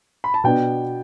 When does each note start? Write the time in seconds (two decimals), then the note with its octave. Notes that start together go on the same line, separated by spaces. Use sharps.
0.24 B5
0.34 A5
0.44 B2 B3 D4 G5